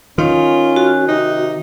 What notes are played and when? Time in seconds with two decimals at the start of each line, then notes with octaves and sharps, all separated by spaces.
0.18 D#3 C#4 F4
0.76 F#4
1.08 C3 D#4